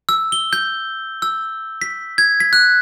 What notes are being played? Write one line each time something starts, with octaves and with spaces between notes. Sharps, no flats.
E6
G7
G6
E6
B6
G#6
B6
F#6